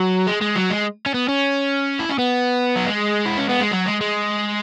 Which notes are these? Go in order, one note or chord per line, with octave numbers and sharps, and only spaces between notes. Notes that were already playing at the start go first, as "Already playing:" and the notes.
Already playing: F#3
G#3
G#3
F#3
G#3
C#4
B3
C#4
E4
C#4
B3
F#3
G#3
E4
C#4
B3
G#3
F#3
G#3
G#3